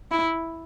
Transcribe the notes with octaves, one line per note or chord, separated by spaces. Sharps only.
E4